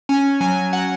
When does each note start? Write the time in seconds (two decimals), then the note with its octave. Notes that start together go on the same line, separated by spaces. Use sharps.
0.09 C#4 G#5
0.41 F#3 G#5
0.73 F#3 F#5